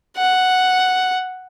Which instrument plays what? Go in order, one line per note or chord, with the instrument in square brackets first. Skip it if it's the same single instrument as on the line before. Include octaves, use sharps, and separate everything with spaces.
[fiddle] F#5